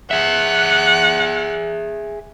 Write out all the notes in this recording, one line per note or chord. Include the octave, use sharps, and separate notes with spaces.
G#4 E5 F#5